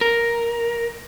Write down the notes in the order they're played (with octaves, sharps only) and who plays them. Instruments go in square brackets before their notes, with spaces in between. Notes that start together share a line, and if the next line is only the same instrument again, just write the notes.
[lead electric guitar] A#4